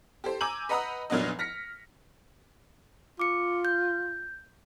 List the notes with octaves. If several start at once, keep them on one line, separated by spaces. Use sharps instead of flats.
G4 A4 C5
G#5 A#5 D6 E6 G6 F#7
B4 D#5 F#5 A#5 B5 D#6
F1 A#2 F#3 B3 D4 D#5
F6 A#6 B6 C#7
F4 D6 C#7
G6